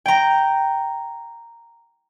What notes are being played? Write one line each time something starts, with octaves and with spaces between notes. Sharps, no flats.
G5 A#5